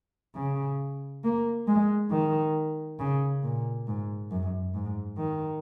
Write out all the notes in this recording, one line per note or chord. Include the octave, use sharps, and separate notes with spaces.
C#3
A#3
G#3
D#3
C#3
A#2
G#2
F#2
G#2
D#3